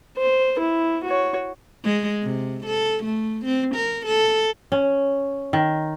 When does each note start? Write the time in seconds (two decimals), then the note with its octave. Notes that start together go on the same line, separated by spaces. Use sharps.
0.17 C5
0.59 E4
1.04 F#4 C#5
1.84 G#3
2.23 C3
2.66 A4
3.04 A3
3.45 C4
3.75 A#4
4.06 A4
4.72 C#4
5.53 D#3